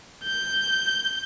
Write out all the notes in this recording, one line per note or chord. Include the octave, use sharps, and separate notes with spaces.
G6